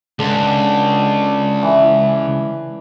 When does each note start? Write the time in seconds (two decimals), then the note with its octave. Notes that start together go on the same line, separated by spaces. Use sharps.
0.19 C#2 D3
1.62 E3